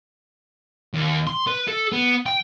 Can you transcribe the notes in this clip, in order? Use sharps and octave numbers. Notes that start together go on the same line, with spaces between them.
D#2
C6
B4
A4
B3
G5